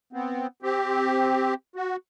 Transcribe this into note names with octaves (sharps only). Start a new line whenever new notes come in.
B3 C4
C4 G4
F#4